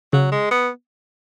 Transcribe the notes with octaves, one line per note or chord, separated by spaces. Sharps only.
C#3 F#3
G#3
B3